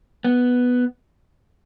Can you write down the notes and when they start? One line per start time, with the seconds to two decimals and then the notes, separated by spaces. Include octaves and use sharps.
0.24 B3